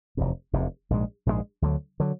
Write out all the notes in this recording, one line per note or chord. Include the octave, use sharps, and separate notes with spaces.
F1 E2 C3
F1 E2 C3
A#1 G#2 E3 G#3
A#1 G#2 E3 G#3
D2 D3 F#3
D3 F#3